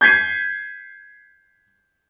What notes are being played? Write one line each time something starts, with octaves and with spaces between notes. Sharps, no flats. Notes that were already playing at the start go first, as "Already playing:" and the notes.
G6 G#6 B6 C7 D#7